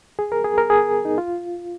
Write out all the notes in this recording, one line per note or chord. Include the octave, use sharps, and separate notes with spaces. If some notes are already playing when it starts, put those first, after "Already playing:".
G#4
A#4
G#4
A#4
G#4
D#4
F4